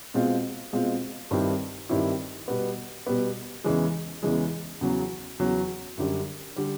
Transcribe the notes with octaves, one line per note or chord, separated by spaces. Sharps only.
B2 G#3 C4 F4
B2 G#3 C4 F4
G2 D#3 G3 C4 E4
G2 D#3 G3 C4 E4
B2 G3 B3
B2 G3 B3
E2 C#3 E3 G#3
E2 C#3 E3 G#3
E2 C#3 F#3
E2 C#3 F#3
F#2 D3 G3
D3 G3